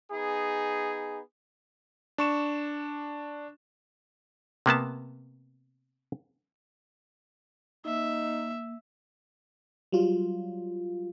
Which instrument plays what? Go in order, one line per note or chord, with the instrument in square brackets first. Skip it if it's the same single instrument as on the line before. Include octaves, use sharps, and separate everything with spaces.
[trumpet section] B3 D#4 G#4
[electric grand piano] D4 C#6 E7
[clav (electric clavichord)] C3 A#3 B3 A5
[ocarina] A#3 [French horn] D#4 [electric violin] E5
[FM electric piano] F#3 G3 F4